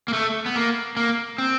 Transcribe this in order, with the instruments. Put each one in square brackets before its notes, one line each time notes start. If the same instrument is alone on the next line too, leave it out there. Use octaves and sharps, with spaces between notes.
[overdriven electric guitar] A#3
A3
B3
A#3
A#3
C4